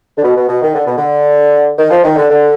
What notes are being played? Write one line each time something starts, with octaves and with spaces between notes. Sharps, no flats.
D3
B2
B2
B2
D#3
D3
B2
D3
D#3
F3
D#3
D3
D3